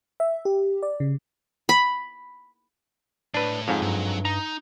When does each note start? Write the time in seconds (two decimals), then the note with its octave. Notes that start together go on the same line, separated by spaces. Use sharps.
0.20 E5
0.45 G4
0.83 D5
1.00 C#3
1.69 B5
3.34 A2 D4 B4
3.68 F2 G#2 C#5 F5
3.82 G2 F#3
4.25 D#4 A#5